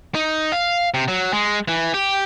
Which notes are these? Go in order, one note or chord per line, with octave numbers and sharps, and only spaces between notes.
D#4
F5
C3
F#3
G#3
E3
G4